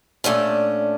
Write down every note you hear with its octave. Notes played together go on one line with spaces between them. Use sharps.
A#2 A3 C#4 D4